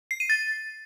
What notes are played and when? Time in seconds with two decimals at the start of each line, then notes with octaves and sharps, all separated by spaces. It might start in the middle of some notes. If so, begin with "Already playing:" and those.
0.11 C7
0.20 D#7
0.30 A6